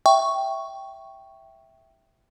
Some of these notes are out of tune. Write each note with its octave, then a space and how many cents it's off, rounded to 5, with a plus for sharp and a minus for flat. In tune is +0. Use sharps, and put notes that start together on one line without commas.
E5 +0 G5 -5 C#6 +0